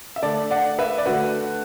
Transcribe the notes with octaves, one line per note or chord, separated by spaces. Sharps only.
E5
D3 A3 A4 D5
D5 F#5
B4 E5
D5
D3 A3 F#4 B4